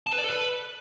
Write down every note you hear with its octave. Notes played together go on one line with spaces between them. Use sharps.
A5
B4
D5
A4
B4